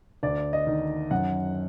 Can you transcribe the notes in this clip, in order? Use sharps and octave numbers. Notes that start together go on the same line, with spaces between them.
D2 D5
D#5
D#3
F#2 F#5